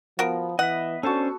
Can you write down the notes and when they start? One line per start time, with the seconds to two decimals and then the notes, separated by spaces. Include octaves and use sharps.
0.19 F3 B3 F#4 A#4
0.59 E3 D#5 E5 F#5
1.03 C#4 D4 F#4 A4 C5 A5